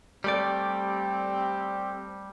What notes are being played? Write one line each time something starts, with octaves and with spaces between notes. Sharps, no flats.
G3 A3 C4 G4 D5